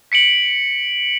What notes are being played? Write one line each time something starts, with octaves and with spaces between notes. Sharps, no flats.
B6 C#7 D7 F#7